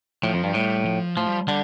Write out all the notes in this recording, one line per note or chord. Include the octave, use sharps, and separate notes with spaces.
A2 F3
F2
G2
A2 G3
F3
A2 F3
G3
D3 G3